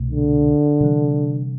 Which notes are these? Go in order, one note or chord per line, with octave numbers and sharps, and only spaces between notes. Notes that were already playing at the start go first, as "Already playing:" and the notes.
Already playing: C2 B2 A3
D3
C3 E3 G3 D4